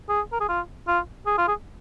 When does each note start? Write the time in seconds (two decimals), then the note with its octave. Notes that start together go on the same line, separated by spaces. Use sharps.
0.09 G#4
0.33 A#4
0.41 G#4
0.49 F4
0.88 F4
1.27 G#4
1.38 F4
1.48 G#4